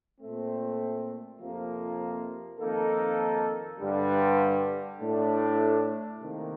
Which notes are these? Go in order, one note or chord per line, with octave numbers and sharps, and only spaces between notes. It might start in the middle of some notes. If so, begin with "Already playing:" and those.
A#2 A3 C4
F2 C3 F3 A#3
F2 D#3 A#3 D#4 A4
G2 D3 G3
A2 A3 D4
C3 D#3 A#3